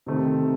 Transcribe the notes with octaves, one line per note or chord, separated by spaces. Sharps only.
C3 D#3 A3 C4